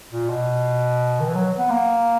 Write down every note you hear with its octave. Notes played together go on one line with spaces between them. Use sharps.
A#2
B2
D#3
E3
F#3
B3
A#3